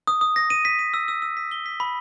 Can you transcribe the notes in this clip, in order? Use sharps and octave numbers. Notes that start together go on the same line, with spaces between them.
D#6
D#6
A#6
D#7
B6
D#7
E6
E6
E6
B6
G7
B6
B5